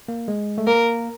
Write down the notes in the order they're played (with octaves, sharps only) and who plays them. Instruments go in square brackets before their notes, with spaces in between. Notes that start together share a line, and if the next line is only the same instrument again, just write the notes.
[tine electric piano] A#3
G#3
A3
[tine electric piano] A#3 [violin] A#4